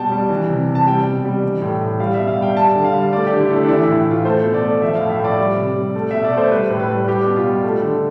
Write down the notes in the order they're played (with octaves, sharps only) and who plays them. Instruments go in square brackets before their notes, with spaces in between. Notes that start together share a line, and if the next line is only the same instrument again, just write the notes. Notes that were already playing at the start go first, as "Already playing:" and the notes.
Already playing: [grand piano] B2 G3 G5 A5
G3
E3
C3
C3
A5
G3 G5
B2
G3
E3
A2
A2
G3 F5
B2 E5
F5
G3
G5
G3 A5
D3
F5
G3
A3 D5
D3 G4
E4
A3 D4
D4
E3 E4
E4
A2
A2 F4
A3 C5
B2
D5
A3
F3 E5
F5
A2
E5
A2
D5
G3
C3
G3
A3
B2 E5
D5
A3
C5
G3 B4
A2
B4
G3
G3 G4
B2
F4
G3
A3
D3